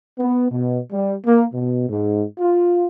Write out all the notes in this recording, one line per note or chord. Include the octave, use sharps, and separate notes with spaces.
B3
B2
G3
A#3
B2
G#2
F4